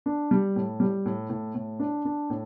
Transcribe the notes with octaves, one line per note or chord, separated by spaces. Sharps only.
D4
G3
A2
G3
A2
A2
A2
D4
D4
A2